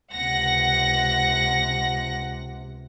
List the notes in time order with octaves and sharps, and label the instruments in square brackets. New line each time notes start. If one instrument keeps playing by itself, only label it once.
[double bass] C#2 C3 [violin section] F#5 A#6